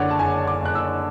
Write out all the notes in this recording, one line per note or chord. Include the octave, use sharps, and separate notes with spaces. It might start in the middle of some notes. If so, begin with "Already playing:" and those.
Already playing: F#1 D3 C#5 D5 F#5
A5
F#1 G#5
D6
F#1 F#6
E6